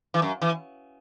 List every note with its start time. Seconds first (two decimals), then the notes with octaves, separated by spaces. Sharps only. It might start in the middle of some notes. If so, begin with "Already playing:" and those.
0.14 E3
0.22 F#2
0.42 E3